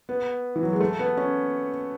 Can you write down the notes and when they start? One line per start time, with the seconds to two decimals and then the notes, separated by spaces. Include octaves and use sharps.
0.09 B3
0.56 E3
0.63 F#3
0.73 G#3
0.81 A3
0.99 B3
1.17 C#4